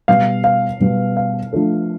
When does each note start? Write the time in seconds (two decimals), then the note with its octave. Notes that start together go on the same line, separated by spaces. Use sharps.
0.08 B2 G3 B3 F5
0.44 F5
0.80 B2 G3 B3
1.17 F5
1.53 F3 A3 D4 A4